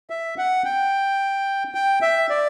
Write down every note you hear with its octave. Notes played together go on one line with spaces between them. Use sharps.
E5
F#5
G5
G5
E5
D5